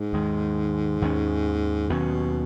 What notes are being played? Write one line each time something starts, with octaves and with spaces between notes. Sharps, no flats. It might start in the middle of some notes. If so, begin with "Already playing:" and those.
Already playing: G#2
D#2 D#3 G#3
D#2 D#3 F#3 C#4
D#2 B2 D#3 F#3 C#4